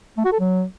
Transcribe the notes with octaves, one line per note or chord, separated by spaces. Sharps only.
A3
F#4
A4
F#3